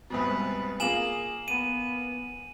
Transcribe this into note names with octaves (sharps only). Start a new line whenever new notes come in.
C2 G#2 B2 B4
A#3 F4 G#4 G#5 E7 F#7
B3 D#7